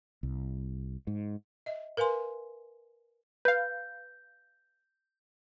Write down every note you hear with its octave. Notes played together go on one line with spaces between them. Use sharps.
C2
G#2
D#5 E5
A#4 B4 F5 G#5 C6
B4 F5 G6